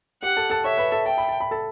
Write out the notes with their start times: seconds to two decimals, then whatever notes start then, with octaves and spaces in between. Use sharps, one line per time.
0.23 G4 F#5 G5
0.37 A4 A5
0.50 A4 A5
0.64 C#5 E5 C#6
0.78 B4 B5
0.92 A4 A5
1.06 G5 A5
1.18 B5
1.29 A5
1.40 B5
1.51 A4 A5